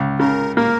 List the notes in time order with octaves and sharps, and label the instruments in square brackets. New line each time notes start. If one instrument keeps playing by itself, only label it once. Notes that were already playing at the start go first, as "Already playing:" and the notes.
Already playing: [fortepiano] C#2
[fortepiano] C#3 [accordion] A#4
[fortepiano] A#3 [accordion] A#4